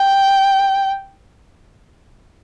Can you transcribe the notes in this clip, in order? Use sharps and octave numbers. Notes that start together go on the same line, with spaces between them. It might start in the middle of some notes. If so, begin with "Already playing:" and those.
Already playing: G5